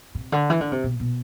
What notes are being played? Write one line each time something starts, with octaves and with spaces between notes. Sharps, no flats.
C3
D3
E3
D3
C3
B2
B2